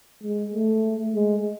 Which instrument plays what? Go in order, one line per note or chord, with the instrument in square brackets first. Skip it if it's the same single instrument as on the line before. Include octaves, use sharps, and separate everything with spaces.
[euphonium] G#3
A3
G#3